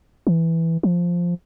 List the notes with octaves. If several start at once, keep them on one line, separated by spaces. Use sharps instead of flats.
E3
F3